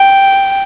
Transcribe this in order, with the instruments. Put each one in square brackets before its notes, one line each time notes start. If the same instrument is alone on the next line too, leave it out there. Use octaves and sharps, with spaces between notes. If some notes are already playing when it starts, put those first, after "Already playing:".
Already playing: [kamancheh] G5